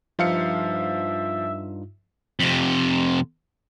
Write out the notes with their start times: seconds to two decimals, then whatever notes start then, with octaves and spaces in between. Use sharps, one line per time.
0.19 G2 F3 D#4 F4 E5 F5 C#7
2.40 F2 C3